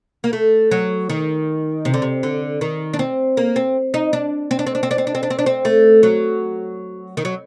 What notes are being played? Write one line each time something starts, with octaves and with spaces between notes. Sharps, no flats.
A#3
A3
F#3
D#3
C3
D3
C3
D3
D#3
D4
C4
A#3
C4
D#4
D4
C4
D4
C4
D4
C4
D4
C4
D4
C4
D4
C4
D4
C4
A3
F#3
D#3
F#3